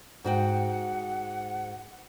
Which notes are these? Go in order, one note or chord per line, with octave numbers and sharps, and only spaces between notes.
G#2 F#4 F#5 G5